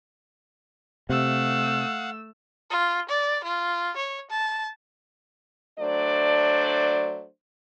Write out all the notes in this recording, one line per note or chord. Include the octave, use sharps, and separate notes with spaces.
C3 A3 F5 F#5 E6
F4
D5
F4
C#5
A5
F#3 A3 D4 C5 D5